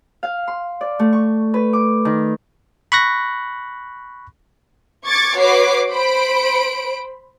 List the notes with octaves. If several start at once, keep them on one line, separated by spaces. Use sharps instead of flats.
F5
C6
D5
A3
C#6
B4
D6
D#3
B5 C#6 F#6 A#6
C#6 D6 G#6 A6 C#7
F#4 B4 C#5 D6 C7
C5 B5 D7